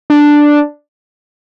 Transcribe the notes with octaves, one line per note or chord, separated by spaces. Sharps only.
D4